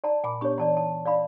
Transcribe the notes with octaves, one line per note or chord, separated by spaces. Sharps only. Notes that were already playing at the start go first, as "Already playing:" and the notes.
D5 A5 A#5
A#2 G#5 B5 D6
B3 D4 G4 C#5 C#6
E3 D5 A5 A#5
A5
D5 F5 B5